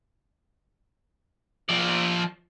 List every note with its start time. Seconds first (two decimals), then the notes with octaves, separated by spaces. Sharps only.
1.69 F3 D5